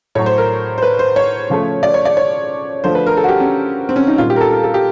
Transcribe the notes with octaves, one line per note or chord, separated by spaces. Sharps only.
A2 F#3 A3 C#5
C5
A#4
C5
B4
C5
C#5
C#3 F3 A3
D5
C#5
D5
C#5
D3 F3 A3 C5
B4
A#4
A4
F#4
G4
C#4
C4
C#4
D#4
A#2 G3 F4
G4
A#4
A4
A#4
A4
G4